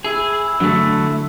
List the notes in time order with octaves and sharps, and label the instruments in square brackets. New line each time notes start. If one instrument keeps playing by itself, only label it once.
[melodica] E4 [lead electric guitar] G#4
[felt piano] D3 [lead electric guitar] F#3 A3